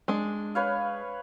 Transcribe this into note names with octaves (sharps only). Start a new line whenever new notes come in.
G#3 D4
B4 C#5 F5